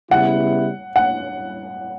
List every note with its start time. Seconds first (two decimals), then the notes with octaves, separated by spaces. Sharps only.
0.11 C#3 G3 B3 E4 F#5
0.96 F#5